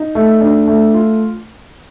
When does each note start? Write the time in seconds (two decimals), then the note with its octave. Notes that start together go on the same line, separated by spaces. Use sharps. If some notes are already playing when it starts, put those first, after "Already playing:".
Already playing: D#4
0.15 A3
0.41 D4
0.67 A3
0.94 F4